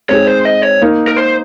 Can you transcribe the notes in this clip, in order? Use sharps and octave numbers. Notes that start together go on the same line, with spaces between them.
G#3 C4 D#4 G#4 C#5
C5
D#5
C#5
A#3 D#4 A#4
A#4
C5